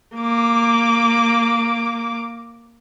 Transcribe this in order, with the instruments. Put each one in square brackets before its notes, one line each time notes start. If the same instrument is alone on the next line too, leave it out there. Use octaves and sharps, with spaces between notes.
[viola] A#3 D6